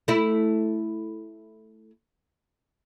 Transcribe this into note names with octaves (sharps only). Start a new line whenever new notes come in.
A3 E4